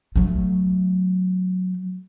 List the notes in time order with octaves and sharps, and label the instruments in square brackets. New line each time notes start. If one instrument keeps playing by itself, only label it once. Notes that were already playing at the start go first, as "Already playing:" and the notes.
[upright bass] F#3 A3